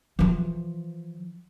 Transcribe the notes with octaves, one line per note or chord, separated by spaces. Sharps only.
E3 F3